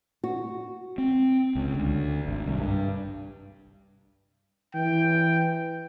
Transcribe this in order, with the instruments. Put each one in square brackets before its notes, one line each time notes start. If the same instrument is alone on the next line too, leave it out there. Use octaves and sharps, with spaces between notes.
[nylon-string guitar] F#4
[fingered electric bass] C4
C#2
D2
G#1
C2
G2
[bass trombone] E3 [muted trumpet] G5